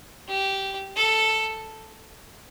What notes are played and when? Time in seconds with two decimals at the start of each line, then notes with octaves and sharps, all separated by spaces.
0.28 G4
0.96 A4